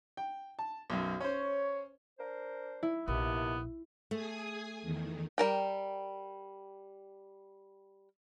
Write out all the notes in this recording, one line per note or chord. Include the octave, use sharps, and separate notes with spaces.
G5
A5
B1 F#2
C#4 C5 C#5
D4 A#4 C5
E4
A#1 D#2 C3 B3
A3 G#4 G#5 D#6
E2 D#3
G3 A#4 G5